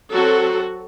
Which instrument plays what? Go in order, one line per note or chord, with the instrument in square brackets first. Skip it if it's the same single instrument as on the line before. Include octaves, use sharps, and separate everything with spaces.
[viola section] F#3 C4 F#4 A4